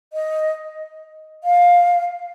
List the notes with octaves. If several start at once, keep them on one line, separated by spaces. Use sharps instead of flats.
D#5
F5